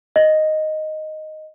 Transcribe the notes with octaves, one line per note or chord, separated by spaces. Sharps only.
D#5